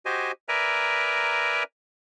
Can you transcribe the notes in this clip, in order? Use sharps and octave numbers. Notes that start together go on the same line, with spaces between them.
F#4 G4 C5 D#5 G#5
A#4 B4 D5 E5 G#5 A#5